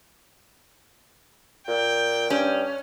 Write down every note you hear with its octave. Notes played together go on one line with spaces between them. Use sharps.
A#2 G5
G2 C#4